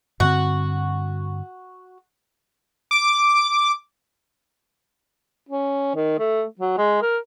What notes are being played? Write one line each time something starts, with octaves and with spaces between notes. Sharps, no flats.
G2 D3 C4 F#4
D6
C#4
D#3
A3
F#3
G#3
A#4